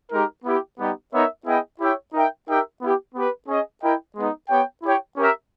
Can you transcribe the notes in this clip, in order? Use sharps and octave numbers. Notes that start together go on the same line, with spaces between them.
G#3 D#4 G4 A#4
B3 E4 G4
G3 B3 D#4 G4
B3 D#4 A#4 C#5 E5
B3 E4 G#4 D#5 G5
E4 G4 C#5 E5 G5
D#4 A#4 E5 G5
D#4 G4 A#4 E5 G5
B3 E4 G4
B3 G4 B4
C#4 G#4 D#5
E4 A#4 D#5 G5
G#3 B3 D#4
B3 G4 C#5 G5
E4 G4 C#5 G5
C#4 G4 A#4 E5